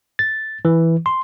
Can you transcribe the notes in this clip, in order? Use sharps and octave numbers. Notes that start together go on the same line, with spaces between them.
A6
E3
C6